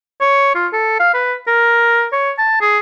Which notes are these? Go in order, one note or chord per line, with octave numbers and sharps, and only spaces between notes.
C#5
F4
A4
F5
B4
A#4
C#5
A5
G#4